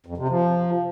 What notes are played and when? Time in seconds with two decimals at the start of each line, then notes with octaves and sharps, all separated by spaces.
0.06 F2
0.17 C3
0.29 F3